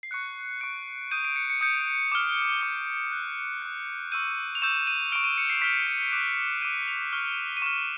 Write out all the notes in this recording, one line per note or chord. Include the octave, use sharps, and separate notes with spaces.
C7
C#6 F#6 C#7
C#6 F#6 D7
D#6 G6 D#7
D7
C#7
C#7
D#6 G6 C#7
D6 F6
D6 F6 C#7
D#6 F#6
D#6 F#6
C#6 E6 G6 D#7
F7
C#6 E6 G6 E7
D#7
C#6 F6 D7
D#7
C#7
C7
C#6 F6 B6
C7
C#7
C#7
D6 F#6 D7
D6 F#6 D#7
F7
C#6 F6
D#7
C#6 F6 E7